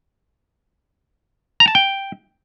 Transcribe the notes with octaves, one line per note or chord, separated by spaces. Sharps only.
A#5
A5
G5